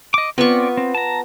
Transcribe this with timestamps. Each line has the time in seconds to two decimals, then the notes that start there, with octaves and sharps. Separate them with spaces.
0.14 D#5 D6
0.38 B3 C4 F4 D5 C#6
0.77 C4
0.95 A5 A#5